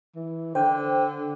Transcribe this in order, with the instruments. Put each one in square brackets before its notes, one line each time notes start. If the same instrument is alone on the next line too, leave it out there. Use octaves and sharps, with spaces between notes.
[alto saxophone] E3
[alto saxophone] D3 [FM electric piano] C5 G5